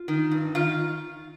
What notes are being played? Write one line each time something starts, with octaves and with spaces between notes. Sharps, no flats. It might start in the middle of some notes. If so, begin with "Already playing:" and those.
Already playing: F4
D#3
G2
D#3 F4